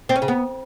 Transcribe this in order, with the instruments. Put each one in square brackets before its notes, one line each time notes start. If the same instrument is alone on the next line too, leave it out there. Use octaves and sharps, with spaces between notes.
[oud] C4
C#4
C#3
B3